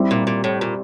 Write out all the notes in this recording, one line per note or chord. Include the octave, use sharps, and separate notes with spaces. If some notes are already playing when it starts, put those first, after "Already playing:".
Already playing: G3 C4 E4
A#2
A#2
A2
A#2